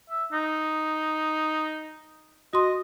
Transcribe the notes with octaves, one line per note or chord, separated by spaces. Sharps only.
E5
D#4
F#4 D#5 C6